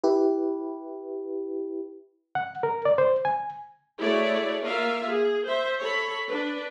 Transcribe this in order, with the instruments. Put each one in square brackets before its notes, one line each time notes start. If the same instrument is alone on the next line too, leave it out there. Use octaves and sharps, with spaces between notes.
[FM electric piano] E4 G4 B4
[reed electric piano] F#5
A#4
D5
C5
G#5
[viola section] A3 E4 F#4 G#4 C#5 D5
A#3 F4 A#4 E5 F5
G#4
C5 E5
A4 C#5 B5
D4 B4